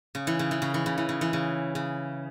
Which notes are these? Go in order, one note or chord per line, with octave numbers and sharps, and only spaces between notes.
C#3
E3
C#3
E3
C#3
E3
C#3
E3
C#3
E3
C#3
C#3